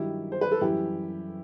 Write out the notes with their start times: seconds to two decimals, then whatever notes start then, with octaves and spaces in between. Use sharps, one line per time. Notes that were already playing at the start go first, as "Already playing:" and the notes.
Already playing: G2 D#3 F#3 E4 G4
0.32 C5
0.41 B4
0.51 A4
0.61 F#2 E3 G3 E4 G4